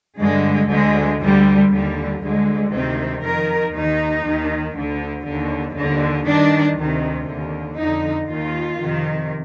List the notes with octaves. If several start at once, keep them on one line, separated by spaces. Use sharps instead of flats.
G2 D3 G#3
D2 D3 G#3
D2 D3 G3
D#2 D3 G3
D2 D3 G#3
D2 C3 D#3 C4
F2 D#3 A#4
D#2 D#3 D#4
D#2 D#3
D2 D3
D#2 D3
D#2 D3
G2 D#3 D4
D2 C3 D#3
D#2 D3
F2 D3 D#4
D#2 D#3 F4
F2 C3 D#3